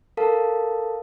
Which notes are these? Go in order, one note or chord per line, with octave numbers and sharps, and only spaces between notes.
A4 A#4 F5 A5